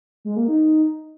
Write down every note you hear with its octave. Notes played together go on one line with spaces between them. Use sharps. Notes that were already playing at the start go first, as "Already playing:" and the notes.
G#3
A#3
D#4